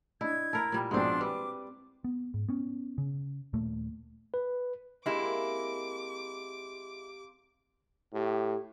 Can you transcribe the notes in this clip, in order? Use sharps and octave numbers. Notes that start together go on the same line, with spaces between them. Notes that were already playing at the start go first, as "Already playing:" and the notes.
D4 E4 D#5 G#6
E4 A#4 A5 B5
A#2 G3
A#1 B2 G#3 C4 D4 C6 D6
G3 B4 D6
B3
G#2
B3 C#4
C#3
D#1 A#2 A3 A#3
B4
G#3 A#3 C4 E4 G4 D6
A2 G4